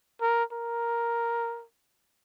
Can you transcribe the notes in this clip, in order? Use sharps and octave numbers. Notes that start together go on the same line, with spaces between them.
A#4
A#4